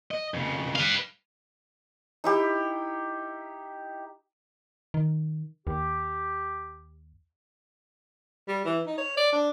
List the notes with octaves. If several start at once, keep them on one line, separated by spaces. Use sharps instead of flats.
D#5
F2 C#3
B4 F5
D#4 E4 G4
D#3
D#2 G4
G3
E3
D#4
C#5
D5
D4